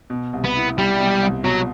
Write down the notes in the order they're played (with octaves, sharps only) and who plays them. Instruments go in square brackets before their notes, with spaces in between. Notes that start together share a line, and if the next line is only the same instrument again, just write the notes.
[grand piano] B2
C2
[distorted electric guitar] B3
[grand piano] E4
[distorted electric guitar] G3 [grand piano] E4
[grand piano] B2
C2
[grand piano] B2 [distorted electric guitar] F#3